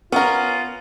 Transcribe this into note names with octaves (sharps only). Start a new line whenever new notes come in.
B3 C#4 F4 A#4